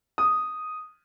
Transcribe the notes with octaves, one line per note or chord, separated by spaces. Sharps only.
D#6